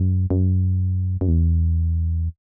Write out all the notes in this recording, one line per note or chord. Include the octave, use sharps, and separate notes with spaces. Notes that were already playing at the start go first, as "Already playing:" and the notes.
Already playing: F#2
F#2
F#2
E2